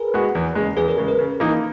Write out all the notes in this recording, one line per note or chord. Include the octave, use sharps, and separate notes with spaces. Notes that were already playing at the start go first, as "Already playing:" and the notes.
Already playing: G#4 A#4 B4
G#3 B3 F#4
E2
C#3 G#3
E2 G#4 B4
A#4
C#3 G#3 G#4
A#4
C#3
E3 A#3 D#4